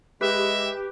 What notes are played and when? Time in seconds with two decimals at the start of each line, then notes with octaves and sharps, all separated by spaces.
0.21 G#3 G4 B4 E5